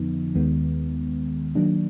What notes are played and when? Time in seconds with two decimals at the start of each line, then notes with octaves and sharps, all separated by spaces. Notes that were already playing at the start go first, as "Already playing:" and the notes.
Already playing: F2 D3 F3 B3 D#4
0.35 D#2 D#3 G#3 B3
1.55 D#3 F#3 A#3 D4